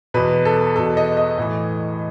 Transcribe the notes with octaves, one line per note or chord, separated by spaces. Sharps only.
E2 B2 B4
A4
E2 B2 A4
D#5
D#5
A2 E3